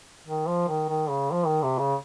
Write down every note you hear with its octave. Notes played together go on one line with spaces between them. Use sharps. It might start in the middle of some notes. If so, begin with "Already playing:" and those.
D#3
F3
D#3
D#3
C#3
F3
D#3
C3
C#3